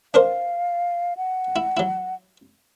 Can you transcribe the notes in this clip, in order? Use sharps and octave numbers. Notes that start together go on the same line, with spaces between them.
D4 A#4 C5 F5
F#5
E4
F#3 E4